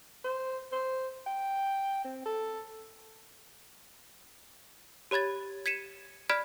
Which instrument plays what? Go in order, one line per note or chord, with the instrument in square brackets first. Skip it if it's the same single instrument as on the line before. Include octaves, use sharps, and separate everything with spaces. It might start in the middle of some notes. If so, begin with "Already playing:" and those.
[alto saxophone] C5
C5
G5
C4
A4
[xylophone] G4 C#5 B5 G#6 A6
G#6 B6 C#7 D#7 E7
D5 B5 F6 G#6 B6 D7